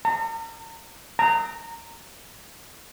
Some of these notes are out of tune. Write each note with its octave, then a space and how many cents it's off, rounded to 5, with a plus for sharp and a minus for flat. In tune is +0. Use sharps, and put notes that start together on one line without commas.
A#5 -40
A#5 -20